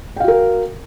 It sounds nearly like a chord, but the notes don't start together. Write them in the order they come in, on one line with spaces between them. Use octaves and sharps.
G5 F5 F#4 A#4